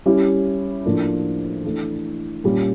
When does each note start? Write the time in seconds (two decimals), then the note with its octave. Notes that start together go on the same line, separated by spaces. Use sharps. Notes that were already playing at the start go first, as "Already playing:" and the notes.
0.06 G3 C#4 E4 G4
0.85 A2 F3 A#3 D4
1.64 E3 A3 D4
2.44 A#2 G3 A#3 C#4